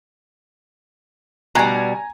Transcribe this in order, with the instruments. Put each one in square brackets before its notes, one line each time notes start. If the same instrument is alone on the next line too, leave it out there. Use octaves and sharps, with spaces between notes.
[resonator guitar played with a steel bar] B2 G3 [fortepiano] G#5 A#5